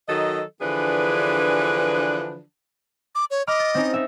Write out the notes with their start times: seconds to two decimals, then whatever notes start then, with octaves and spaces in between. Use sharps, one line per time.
0.09 D#3 F#3 A4 D#5
0.61 D3 E3 F3 D4 G#4 B4
3.15 D6
3.31 C#5
3.47 D#5 B5 D6 F6
3.60 A6
3.75 C4 C#4 D#4
3.94 D#4 E5